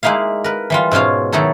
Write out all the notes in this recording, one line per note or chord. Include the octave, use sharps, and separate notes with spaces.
G#3 A#3 D#4 E4 F5
A#4 B4
E3 G3 F4
G#2 B2 C#4 F4 F5
D#3 F#3 D#4 E4 A4